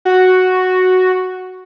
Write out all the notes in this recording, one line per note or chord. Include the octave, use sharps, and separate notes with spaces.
F#4